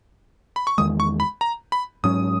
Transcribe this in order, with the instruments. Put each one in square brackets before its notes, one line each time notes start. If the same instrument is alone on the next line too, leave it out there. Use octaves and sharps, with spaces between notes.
[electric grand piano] B5
C#6
[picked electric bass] E2 D#3 G#3 [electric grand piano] D#6
[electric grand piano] C#6
B5
A#5
B5
[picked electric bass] G#2 F#3 C#4 [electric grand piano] D#6